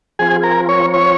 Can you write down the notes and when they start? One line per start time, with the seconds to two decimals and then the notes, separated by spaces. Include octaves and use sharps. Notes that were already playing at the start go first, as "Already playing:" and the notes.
0.19 F3 C4 F4 G#4
0.43 A#4
0.69 C#5
0.94 C#5